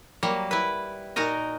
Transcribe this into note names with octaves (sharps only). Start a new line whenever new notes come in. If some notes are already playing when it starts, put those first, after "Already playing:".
F#3 G3 A#3
E4 B4
A#2 D#4 F#4 A#4 D#5